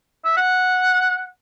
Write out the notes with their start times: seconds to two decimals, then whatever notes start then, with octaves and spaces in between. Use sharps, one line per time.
0.25 E5
0.37 F#5